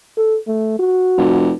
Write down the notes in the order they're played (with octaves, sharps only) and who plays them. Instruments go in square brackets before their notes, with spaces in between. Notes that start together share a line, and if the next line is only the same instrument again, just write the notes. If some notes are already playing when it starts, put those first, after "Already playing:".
[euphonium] A4
A3
F#4
[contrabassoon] F1